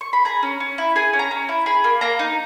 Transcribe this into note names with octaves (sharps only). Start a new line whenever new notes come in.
C#6
B5
G#4 A#5
C#4
C#4
E4
G#4 G#5
C#4
A#5
C#4
E4
G#4 B5
A#3
A#3 A#5
D#4